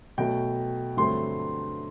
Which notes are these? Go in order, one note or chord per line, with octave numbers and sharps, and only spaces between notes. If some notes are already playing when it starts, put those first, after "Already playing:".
B2 F#3 A3 G5
G2 D3 F#3 A3 C4 C6